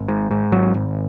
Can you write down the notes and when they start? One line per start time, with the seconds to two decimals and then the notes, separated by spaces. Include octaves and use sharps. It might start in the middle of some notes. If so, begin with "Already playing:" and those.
Already playing: G#1
0.08 G#2
0.31 G#2
0.52 G#1 F#3
0.74 G#1